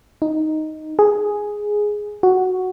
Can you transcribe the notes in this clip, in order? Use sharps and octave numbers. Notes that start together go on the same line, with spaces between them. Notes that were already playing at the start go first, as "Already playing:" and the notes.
D#4
G#4
F#4